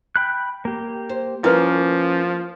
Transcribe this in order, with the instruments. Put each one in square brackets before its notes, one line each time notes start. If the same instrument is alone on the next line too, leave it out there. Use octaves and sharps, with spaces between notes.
[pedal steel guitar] G5 B5 F#6
A#3 G4
[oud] C5
[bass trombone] F3 [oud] A#3 [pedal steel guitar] C#4 [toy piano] E4 B4